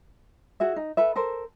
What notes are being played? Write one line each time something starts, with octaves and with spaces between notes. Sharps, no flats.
F#4 G#4 E5
D#4
A4 B4 E5
A4 A#4 C5